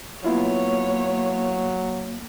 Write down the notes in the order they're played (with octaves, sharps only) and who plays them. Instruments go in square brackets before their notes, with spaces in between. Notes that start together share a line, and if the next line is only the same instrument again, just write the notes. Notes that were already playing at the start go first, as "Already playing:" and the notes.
[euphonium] F#3 [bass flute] A#3 [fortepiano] B3 E4 F4 [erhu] C#5